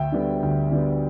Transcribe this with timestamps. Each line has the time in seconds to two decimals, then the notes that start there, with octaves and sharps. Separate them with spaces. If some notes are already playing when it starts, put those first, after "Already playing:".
Already playing: D2 E5 G5
0.12 D3 G3 B3
0.43 D2
0.71 D3 G3 B3